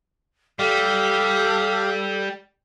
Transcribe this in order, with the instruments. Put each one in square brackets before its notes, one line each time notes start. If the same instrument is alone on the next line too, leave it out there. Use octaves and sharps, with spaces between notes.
[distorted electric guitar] G3 [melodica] G4 F5 [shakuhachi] A4